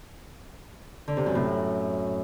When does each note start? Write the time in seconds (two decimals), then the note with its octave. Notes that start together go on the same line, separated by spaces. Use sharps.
1.08 D3
1.17 C3
1.26 F#2
1.35 A2